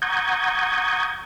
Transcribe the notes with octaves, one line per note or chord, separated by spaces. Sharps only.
F#5 A#5 C#6 D#6 G6 G#6